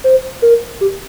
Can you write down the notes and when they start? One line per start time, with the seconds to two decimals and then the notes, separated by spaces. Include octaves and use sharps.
0.04 C5
0.42 A#4
0.81 G4